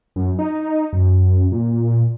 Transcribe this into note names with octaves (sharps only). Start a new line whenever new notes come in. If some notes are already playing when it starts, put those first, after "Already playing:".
F#2
D#4
F#2
A#2